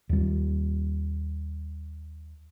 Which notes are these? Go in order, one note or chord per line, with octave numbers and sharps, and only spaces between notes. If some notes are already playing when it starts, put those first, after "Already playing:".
D#2 G3